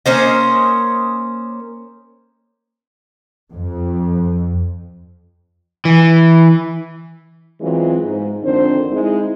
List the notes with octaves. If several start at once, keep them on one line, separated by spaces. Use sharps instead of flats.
A#3 C#4 C5 D#5
F2
E3
E3 F#3 G#3 B3 C4 F4
G#2
F2 D3 D#3 C4 D4 C5
G#3 C4 D#4 E4